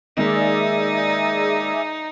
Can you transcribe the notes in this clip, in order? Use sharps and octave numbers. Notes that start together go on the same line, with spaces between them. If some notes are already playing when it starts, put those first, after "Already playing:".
D#3 G#3 A#3 D#4 G#4 D5 E5